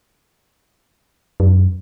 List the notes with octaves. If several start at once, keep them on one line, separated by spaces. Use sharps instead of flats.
F#2